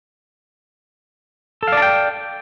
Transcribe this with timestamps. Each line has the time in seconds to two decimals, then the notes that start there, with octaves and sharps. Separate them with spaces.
1.63 A4
1.68 F5
1.72 D5
1.77 A5
1.82 G5